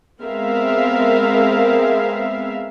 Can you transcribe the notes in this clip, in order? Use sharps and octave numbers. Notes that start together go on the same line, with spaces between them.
G#3 B3 C4 A#4 E5 F5